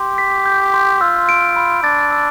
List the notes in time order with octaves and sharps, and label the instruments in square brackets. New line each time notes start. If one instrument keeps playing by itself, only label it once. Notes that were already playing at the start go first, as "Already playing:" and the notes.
Already playing: [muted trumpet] G4 [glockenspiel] C6
[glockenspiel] B6
G6
C6
[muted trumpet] F4 [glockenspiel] E6
[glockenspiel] D7
B5
[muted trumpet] D4 [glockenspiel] A6
[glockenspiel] E6